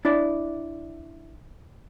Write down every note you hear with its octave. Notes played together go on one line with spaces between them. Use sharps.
D4 E4 D5